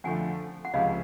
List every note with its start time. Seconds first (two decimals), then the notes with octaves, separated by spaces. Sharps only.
0.04 F2 D3 F3 A3 F#5 G#5
0.65 F#5
0.73 C#2 C3 F3 G#3 C#4 D#5 F5